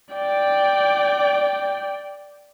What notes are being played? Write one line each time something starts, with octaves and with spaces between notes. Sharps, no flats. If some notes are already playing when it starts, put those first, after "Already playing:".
D5 G5